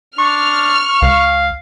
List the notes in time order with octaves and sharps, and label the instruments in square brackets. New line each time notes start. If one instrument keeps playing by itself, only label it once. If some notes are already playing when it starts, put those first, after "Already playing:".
[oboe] D4 [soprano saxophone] C#6 [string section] F6
[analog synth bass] C#2 [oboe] F5